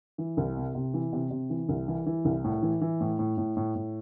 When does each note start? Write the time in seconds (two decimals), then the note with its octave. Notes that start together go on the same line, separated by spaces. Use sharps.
0.18 E3
0.37 C2
0.57 C3
0.75 C3
0.94 E3
1.13 C3
1.31 C3
1.50 E3
1.69 C2
1.88 E3
2.06 E3
2.25 C2
2.44 A2
2.62 E3
2.81 E3
3.01 A2
3.19 A2
3.38 A2
3.57 A2
3.75 A2